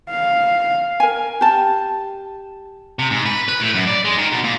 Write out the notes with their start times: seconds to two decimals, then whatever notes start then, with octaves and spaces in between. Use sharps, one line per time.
0.10 F5
1.00 A#4 G#5
1.41 G4 A5
2.99 C3
3.10 G#2
3.26 B4
3.48 B4
3.60 A2
3.75 F#2
3.87 D5
4.05 G#3
4.18 D#3
4.32 B2
4.44 A#2